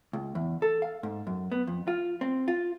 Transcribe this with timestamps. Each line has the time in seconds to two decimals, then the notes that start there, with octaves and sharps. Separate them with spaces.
0.13 C#2
0.35 E2
0.62 A4
0.82 F5
1.03 G#2
1.27 F#2
1.52 B3
1.67 F2
1.88 F4
2.21 C4
2.48 F4